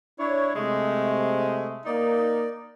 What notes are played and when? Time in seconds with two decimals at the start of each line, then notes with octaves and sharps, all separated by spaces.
0.19 D4 E4 C#5
0.55 C3 G#3 A3
1.86 A#3 D#4 D5